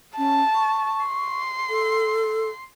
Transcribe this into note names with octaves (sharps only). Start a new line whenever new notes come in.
C#4 A5
C#6
C6
A4